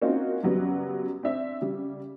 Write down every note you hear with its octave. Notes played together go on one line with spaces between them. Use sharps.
A#3 C4 C#4 D#4 F4 F#4
F#2 C#3 F#3 G3 B3
C4 D4 E5
C#3 G3